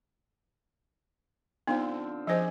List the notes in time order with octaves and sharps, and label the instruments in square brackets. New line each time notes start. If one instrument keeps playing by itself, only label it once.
[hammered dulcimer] D3 F3 C4 [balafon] B3 D#4
[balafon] F3 C5 [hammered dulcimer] G4 G#4 D#5